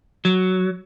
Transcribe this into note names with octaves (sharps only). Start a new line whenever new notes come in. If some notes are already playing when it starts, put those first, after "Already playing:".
F#3